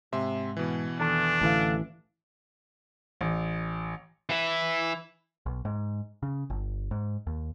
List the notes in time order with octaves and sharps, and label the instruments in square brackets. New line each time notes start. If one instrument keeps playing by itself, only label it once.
[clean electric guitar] G#2 [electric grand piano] C3 E5 C6
[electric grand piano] B2 E3
[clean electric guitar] E2 D#3 A4 [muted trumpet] D4
[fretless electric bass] A1 E3 [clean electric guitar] D2 A4 F5
[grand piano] A1
[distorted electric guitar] E3 E4
[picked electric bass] B1
G#2
C#3
G1
G#2
D#2